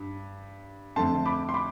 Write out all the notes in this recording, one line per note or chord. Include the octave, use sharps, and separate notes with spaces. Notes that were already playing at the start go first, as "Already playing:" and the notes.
Already playing: G2
F2 D3 A3 C4 A5 C6
B5 D6
C6
B5 D6